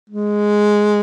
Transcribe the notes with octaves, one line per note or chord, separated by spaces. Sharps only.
G#3